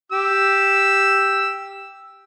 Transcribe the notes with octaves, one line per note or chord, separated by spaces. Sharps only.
G4 E6